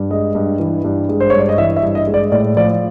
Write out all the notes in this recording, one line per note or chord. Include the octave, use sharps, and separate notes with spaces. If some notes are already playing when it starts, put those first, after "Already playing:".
Already playing: G2
G#3 D#5
G2
E3
G2
G#3
C5
G2 C#5
D5
D#5
E3 E5
E5
G2
D#5
G#3
D5
A2 D5
F3 D5